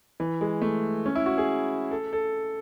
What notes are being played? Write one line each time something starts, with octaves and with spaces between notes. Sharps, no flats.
E3
G#3
A3
C#4
E4
F#4
G#4
A4
A4